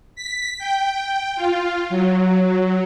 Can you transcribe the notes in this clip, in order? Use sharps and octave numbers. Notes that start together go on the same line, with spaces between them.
B6
G5
F4
F#3